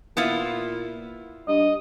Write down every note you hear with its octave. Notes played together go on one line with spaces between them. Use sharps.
A#2 B3 E4 F4
G2 D#5